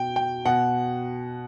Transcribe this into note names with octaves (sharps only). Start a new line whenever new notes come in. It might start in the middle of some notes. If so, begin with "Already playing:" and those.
Already playing: B2 G5
G5
B2 F#5